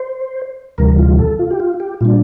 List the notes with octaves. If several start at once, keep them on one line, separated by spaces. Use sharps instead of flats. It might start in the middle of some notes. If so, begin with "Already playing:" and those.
Already playing: C5
D2 C3 E3 G3 A#4
F4
A4
F4
G4
F4
G4
A#2 G3 D4 F4